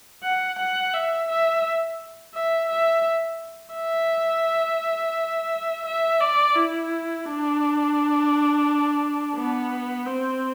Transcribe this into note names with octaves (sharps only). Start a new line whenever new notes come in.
F#5
F#5
E5
E5
E5
E5
E5
E5
D5
E4
D4
B3
C4